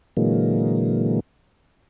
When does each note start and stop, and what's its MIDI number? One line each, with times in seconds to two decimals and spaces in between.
0.17 1.20 46
0.17 1.20 50
0.17 1.20 52
0.17 1.20 54
0.17 1.20 56
0.17 1.20 58